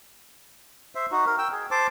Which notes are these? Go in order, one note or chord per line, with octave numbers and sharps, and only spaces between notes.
C5 E5
D#4 F#4
A#4
G5 E6
G#4
C5 A5 D6